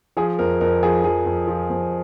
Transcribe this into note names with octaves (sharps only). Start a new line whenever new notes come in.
F3 G#4
F2 A#4
F2 A#4
F3 G#4
F3 G#4
F2
F3
F2